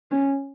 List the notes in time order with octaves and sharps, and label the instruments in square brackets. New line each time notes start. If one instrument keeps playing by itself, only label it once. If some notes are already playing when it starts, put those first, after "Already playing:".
[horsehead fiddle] C#4